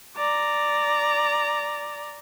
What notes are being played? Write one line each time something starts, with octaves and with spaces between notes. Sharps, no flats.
D5 A#5